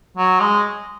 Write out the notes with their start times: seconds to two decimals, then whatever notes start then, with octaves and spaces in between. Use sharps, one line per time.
0.17 F#3
0.40 G#3